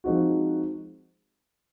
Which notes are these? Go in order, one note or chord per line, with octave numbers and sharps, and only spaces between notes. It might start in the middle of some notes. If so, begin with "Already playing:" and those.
F3 G#3 C4 D#4 F#4